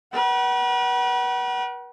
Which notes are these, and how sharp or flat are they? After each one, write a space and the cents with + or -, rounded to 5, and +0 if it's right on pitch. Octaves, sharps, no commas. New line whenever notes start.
B4 -40 F#5 +35